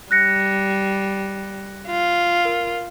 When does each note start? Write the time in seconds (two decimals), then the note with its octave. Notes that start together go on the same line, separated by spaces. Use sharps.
0.11 G3 F#6 A#6 C#7
1.88 F4
2.45 A#4